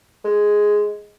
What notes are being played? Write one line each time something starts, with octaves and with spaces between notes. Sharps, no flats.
G#3